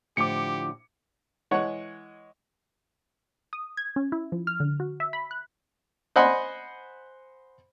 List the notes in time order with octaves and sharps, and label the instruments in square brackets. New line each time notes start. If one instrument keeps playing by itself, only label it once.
[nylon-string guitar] A2 D3 F3 [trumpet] G4 [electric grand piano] D6 C#7
[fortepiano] E3 G#3 C#5 F#5 C#6
[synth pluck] D#6
G#6
C#4
E4
F3
F6
D3
F#4
E5
B5
F#6
[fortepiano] C5 D#5 F#5 G#5 B5 C6